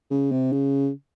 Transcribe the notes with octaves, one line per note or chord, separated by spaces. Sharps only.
C#3
C3
C#3